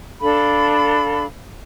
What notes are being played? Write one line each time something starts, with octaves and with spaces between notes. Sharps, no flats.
D4 A4 F5 B5